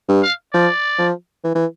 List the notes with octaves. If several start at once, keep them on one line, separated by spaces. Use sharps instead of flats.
G2
F5
F3 D5
F3
E3
E3